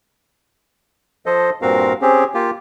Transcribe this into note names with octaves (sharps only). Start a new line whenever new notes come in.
F3 A4 C5 D#5
G2 A#2 C4 F#4 A#4 F5
C4 C#4 G4 G#4
A#3 F4 G4